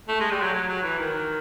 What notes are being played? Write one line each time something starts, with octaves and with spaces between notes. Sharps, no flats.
A3
G#3
G3
F#3
F#3
F#3
E3
D#3